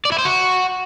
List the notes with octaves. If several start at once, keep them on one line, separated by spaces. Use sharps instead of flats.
D5
E4
C5
F#4